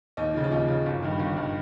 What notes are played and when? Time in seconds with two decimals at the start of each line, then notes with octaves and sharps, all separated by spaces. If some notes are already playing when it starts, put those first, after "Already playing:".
0.17 D#2 D#4
0.34 C#3 F3
0.44 F4
0.51 D#2 D#4
0.68 C#3 F3
0.86 G1
1.02 G2 D#3
1.19 G1
1.37 G2 D#3